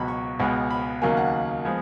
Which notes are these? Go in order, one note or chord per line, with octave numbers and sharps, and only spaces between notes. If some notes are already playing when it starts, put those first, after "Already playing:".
Already playing: C#2 B2 F#3 B5
C#6
C#2 B2 G#3 B3
B5
D#2 C#3 F#3 A#3 G#5
F#5
F3 G#3 B3